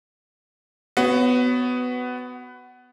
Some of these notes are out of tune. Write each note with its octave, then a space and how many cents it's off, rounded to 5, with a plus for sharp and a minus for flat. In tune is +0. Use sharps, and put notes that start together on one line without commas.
B3 +15 F#4 +15 C#5 +0